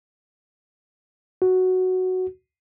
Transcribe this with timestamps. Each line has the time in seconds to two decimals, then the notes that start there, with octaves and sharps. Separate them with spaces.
1.42 F#4